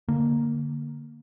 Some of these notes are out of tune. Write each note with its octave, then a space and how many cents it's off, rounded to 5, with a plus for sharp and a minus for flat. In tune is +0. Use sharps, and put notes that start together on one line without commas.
D3 +0 A#3 +0